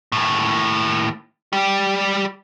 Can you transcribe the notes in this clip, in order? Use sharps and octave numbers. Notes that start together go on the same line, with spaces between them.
D#2 A2
G3 G4